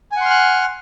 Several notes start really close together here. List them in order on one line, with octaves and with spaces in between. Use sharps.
G#5 F#5 C6 F6 F#6